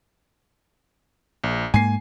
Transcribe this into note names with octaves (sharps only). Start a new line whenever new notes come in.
A#1
G#2 A#3 G#5 C7